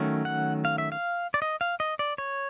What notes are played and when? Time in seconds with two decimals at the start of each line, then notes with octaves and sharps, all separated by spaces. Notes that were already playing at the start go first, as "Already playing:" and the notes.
Already playing: D#3 F#3 A3 C#4
0.25 F#5
0.65 F5
0.78 E5
0.92 F5
1.34 D5
1.42 D#5
1.61 F5
1.80 D#5
1.99 D5
2.18 C#5